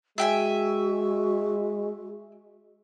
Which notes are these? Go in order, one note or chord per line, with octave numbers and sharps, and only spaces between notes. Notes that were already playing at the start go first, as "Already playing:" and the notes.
G#3 F#4 E5 G5 G#5